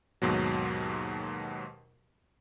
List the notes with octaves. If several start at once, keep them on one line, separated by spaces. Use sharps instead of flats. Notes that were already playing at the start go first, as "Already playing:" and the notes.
D#2 G#2 B2 F#3